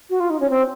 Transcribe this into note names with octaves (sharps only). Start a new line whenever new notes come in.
F#4
F4
D#4
C#4
C4